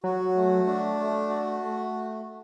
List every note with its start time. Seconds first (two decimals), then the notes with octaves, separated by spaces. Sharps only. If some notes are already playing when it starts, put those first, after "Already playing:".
0.04 F#3 F#4
0.36 A3
0.66 D4
0.99 A3
1.29 F#4
1.62 A3